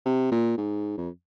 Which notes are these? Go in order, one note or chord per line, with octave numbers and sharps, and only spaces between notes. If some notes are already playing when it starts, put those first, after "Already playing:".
C3
A#2
G#2
F2